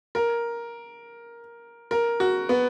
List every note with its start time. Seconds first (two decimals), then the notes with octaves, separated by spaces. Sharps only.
0.15 A#4
1.91 A#4
2.20 F#4
2.49 B3